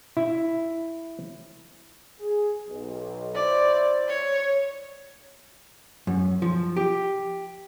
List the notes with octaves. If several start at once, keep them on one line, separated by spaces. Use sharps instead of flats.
E4
G#4
B1
E4 C5 D5
C#5
F#2
F3
G4